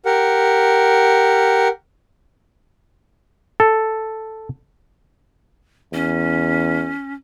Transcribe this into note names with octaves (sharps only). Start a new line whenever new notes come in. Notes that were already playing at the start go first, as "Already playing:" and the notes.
G4 A#4 F#5
A4
E2 C#4